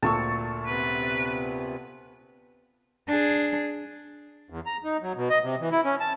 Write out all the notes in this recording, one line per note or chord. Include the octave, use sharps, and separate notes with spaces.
D2 A#2 A5 C#6 E6
C3 B3 B4
D4 G#4
E2
A#5
D#4
F#3
B2
D#5
C3
E3
E4
C#4
A5